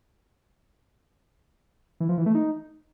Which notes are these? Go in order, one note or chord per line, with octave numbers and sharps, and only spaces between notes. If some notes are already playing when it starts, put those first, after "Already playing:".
E3
F3
E3
A3
D#4